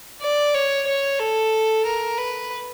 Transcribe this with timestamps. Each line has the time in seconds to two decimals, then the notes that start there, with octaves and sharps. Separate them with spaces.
0.22 D5
0.54 C#5
0.87 C#5
1.20 A4
1.85 A#4
2.18 B4